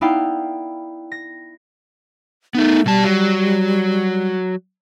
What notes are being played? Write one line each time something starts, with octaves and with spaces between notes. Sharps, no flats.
B3 D#4 E4 D5 F5 G5
A#6
A3 B3 D#4
B2 G3 A5
F#3